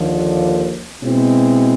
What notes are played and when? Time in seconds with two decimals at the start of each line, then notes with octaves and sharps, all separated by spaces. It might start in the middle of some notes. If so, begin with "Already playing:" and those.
Already playing: D#2 D3 F3
1.03 B2 G#3 C4 E4